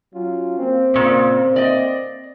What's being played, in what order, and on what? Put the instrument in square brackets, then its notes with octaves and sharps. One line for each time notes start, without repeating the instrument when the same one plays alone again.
[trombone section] F#3 C#4 F4
A#3 C4
[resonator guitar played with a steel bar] A#2 C#3
D5 D#5